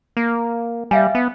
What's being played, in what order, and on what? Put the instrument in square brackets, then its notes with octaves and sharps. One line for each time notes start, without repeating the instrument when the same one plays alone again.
[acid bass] A#3
[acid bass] G3 [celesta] E5 F5 G#5
[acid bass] B3